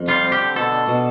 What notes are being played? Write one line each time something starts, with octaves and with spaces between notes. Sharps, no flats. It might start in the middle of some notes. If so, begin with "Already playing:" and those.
Already playing: F2
G3 F4
C4
G4
D3
B2 A4
D4
B2